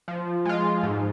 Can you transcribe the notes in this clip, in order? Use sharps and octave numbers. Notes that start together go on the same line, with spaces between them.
F3
G#3 F4
G#2